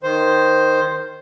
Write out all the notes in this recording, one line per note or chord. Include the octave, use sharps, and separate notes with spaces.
D#3 C5